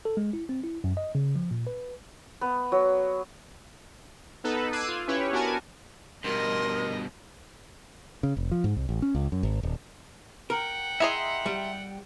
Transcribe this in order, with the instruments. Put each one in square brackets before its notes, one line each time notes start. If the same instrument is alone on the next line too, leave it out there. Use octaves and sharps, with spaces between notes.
[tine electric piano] A4
G#3
E4
C4
E4
F#2
D#5
C#3
F3
A#2
B4
[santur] B3
F#3
[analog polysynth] B3 D#4 A4 B4
D6 E6 F#6 G#6 C7 D#7
F4
C#4 E4 G4 B4 C#5
B3 D4 F#4 A#4 G#5 A5
[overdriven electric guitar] G2 B2 [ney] A#4 [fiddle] D#5 [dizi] C6
[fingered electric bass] C#3
F1
F3
G#2
C2
A1
C#4
C#2
F#2
G#1
D#1
[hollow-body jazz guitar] A#4 [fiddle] F#5 G5
[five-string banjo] E4 G#4 D#5 [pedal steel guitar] E5 A#5 C6
[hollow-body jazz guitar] G3